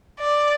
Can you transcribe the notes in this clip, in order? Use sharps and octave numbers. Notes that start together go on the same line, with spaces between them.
D5